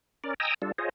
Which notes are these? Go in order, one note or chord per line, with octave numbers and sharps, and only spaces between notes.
C#4 A#4 D5
D#5 G5 G#5 A#5 D#6 E6
G3 D4 F4 A4
F4 G#4 C5 C#5 D#5